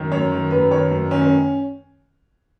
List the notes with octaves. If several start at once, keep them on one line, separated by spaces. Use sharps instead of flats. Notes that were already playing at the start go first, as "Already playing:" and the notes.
Already playing: F#2 D#3
F#2 C#5
D#3
F#2 B4
D#3 C#5
F#2
D#3 C#4
C#4